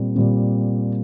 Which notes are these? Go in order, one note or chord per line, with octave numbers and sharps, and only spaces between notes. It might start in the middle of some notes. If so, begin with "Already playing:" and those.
Already playing: A#2 G3 C4
A#2 G3 C4